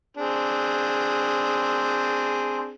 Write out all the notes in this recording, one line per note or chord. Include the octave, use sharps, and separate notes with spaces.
C4 D4 G#4